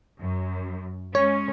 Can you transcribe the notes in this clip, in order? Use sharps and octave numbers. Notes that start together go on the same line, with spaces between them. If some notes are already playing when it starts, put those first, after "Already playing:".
F#2
G#3 C#4 C#5